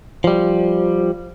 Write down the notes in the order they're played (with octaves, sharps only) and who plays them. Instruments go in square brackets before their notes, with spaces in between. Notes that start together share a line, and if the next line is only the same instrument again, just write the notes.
[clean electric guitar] F3 G3